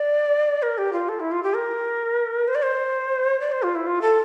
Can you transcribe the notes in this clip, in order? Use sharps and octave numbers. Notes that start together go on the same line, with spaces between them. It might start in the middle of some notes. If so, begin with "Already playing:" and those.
Already playing: D5
A#4
G4
F4
A4
E4
F4
G4
A#4
C5
D5
C5
D5
C5
F4
E4
F4
A4